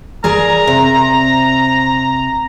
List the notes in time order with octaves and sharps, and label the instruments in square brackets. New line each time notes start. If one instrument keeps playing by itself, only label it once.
[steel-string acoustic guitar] G#4 A#4 D5 [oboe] A#5
[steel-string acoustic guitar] C3